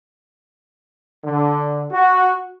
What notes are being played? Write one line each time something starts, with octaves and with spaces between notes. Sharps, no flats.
D3
F#4